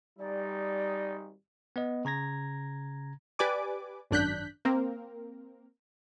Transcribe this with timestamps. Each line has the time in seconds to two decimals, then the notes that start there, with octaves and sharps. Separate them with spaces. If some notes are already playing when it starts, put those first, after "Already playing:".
0.19 G#1 G3 D#4 D5
1.76 B3 B4 D#5
2.05 C#3 A#5 G#6 A#6
3.39 G4 B4 D5 G#5 D6
4.11 G#1 F#2 D4 F#6 G6 B6
4.65 A#3 C4 A#4